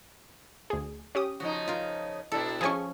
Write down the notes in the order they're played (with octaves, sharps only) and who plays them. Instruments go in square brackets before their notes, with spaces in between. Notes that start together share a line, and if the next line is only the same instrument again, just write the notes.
[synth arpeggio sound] D2 G#4
C#4 G4 D#6
[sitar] C#3 F3 D#4 [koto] F#4
[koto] F4 A#4
[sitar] B2 D4 E4 [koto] A4
[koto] F3 C#4 [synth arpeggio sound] G#4 G#5 C#6